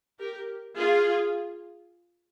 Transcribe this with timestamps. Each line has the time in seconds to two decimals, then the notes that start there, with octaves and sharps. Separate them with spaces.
0.19 G4 A#4
0.78 F4 G#4